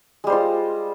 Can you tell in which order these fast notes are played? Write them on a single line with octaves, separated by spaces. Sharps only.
G#3 G3 C5 F4